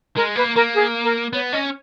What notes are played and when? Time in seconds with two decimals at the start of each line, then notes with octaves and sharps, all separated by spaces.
0.16 G#3 A#4
0.36 A#3 B4
0.56 A#3 A#4
0.75 G#4
1.04 A#4
1.33 B3 C#5
1.53 C#4 D#5